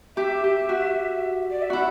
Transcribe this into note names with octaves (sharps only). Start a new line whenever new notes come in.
G4 E5
G4
F#4
D5
E5
E4 F#4 F#5